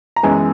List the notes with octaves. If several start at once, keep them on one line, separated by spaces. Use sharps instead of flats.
A#5
F#2 E3 G#3 B3 G#5